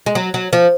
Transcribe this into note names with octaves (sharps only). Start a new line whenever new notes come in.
G#3
F#3
F#3
F3